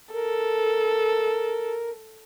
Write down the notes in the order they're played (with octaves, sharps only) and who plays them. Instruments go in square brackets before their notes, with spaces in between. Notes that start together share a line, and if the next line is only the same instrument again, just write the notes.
[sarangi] A4 [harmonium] A#4